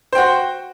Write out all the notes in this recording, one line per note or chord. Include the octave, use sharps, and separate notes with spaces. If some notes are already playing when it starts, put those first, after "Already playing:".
F#4 C5 G5